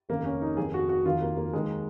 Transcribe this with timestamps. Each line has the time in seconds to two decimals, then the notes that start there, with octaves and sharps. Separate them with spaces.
0.09 F1 D#2 C#3 A#3
0.25 C#4
0.42 D#4
0.57 F1 F2 D#3 G#4
0.74 F#4
0.89 F#4
1.05 F1 D#2 D#3 F4
1.22 A#3
1.37 A#3
1.53 D#2 D#3 G#3